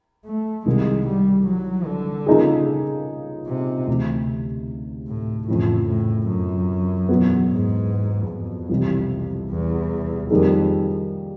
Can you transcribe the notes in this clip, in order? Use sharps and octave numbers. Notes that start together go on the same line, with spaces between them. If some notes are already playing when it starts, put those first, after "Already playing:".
A3
C2 C3 D#3 G#3
G3
F#3
D3
C#3 F3 A#3 D#4 G#4
C3
D2 C3 E3
A2
F2 A2 C#3 E3
A2
F#2
E2 B2 F#3 B3
G#2
F2
C2 C3 E3 G3
E2
F2 D#3 G3 A#3 D#4 G#4